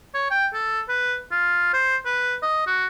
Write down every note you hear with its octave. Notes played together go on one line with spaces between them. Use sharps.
C#5
G5
A4
B4
F4
C5
B4
D#5
F#4